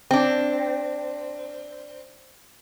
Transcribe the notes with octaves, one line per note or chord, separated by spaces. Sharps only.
C4 D4